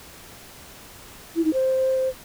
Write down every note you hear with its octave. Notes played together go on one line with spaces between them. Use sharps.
E4
D#4
C5